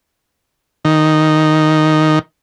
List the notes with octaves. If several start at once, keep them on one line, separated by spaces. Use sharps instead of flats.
D#3